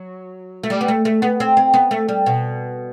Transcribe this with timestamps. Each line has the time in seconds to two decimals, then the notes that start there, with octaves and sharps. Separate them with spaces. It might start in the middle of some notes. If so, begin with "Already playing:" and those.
Already playing: F#3
0.63 A3
0.70 G3
0.81 B3
0.88 A3
1.05 A3
1.22 B3
1.40 C4
1.57 C4
1.74 B3
1.91 A3
2.08 G3
2.26 B2